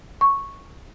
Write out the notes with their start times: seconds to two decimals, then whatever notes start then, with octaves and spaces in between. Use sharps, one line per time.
0.21 C#6